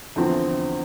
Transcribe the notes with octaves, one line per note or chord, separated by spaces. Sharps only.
E2 D3 F3 C4 E4